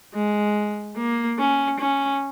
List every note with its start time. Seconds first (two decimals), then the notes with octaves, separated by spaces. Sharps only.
0.14 G#3
0.97 A#3
1.39 C#4
1.80 C#4